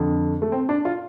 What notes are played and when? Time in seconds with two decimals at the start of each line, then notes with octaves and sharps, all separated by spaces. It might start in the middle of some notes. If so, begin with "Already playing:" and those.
Already playing: F2 D3
0.42 A3
0.52 C4
0.69 D4
0.85 F4